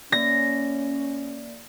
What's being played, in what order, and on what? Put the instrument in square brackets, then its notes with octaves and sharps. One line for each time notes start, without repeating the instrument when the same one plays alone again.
[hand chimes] A#3 D5 [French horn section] C#4 [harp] A#6